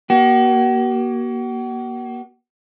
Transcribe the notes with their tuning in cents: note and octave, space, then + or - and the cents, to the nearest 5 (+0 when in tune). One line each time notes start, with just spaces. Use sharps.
A#3 +35 F#4 +40